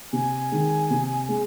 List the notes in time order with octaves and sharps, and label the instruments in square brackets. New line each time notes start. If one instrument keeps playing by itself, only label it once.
[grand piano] C3 [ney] G#5
[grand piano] D#3 G#3
C3
G#3